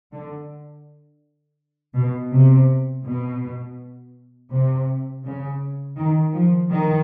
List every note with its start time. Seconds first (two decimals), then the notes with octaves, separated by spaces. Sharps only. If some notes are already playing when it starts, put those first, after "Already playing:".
0.12 D3
1.94 B2
2.31 C3
3.04 B2
4.51 C3
5.24 C#3
5.96 D#3
6.33 F3
6.70 D#3